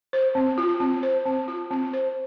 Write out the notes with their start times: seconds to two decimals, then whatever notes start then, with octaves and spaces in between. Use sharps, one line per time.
0.13 C5
0.35 C4
0.58 F4
0.80 C4
1.03 C5
1.26 C4
1.48 F4
1.71 C4
1.93 C5